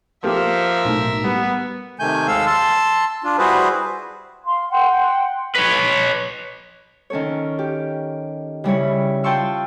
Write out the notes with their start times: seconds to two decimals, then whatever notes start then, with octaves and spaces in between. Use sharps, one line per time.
0.24 F3 A#3 G4 A4 A#4 E5
0.84 B1 A2
1.24 G3 B3
1.99 C3 D#3 A3 G#5 G6
2.27 D#2 G#3 A4 F5 E6
2.46 A5 C6 E6
3.24 D4 F4
3.38 G3 E4 F#4 G#4 B4 C5
4.45 F5 C6
4.70 F#5 G5 C6
5.56 B4 C#5
7.10 D#3 C#4 A4 C#5
7.59 G4
8.64 C#3 G3 E4 C#5
9.24 F4 G5 A5 C6 C#6 E6